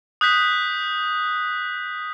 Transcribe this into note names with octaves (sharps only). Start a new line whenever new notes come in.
D#6 F#6 G6 B6